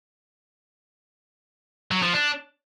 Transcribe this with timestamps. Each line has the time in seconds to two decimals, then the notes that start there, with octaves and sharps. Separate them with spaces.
1.91 F#3
2.03 F3
2.14 D4